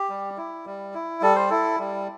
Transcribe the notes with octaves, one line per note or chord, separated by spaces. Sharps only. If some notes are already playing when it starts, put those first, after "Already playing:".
Already playing: G4
G3
E4
G3
E4
G3 A4
C5
E4 A4
G3